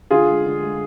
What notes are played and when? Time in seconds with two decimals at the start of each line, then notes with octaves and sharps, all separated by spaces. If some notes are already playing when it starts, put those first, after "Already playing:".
0.11 D3 F4 G#4
0.28 G#3
0.46 D3
0.62 G#3